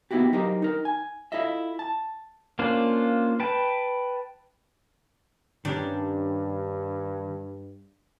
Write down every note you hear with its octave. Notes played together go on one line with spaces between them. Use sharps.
A#3 B3 D#4 E4 F#4 G4
F#3 D#4 G4 A#4 C5 D#5
D#4 A#4
G#5
E4 F4 A4 D#5 E5
A5
A#3 C#4 D4 F4 C5
B4 G5 A5
G2 D#3 G3 C#4 D4